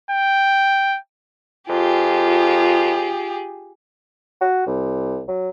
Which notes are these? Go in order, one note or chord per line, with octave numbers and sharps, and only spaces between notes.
G5
F2 F4 G4 G#4
F#4
C2
F#3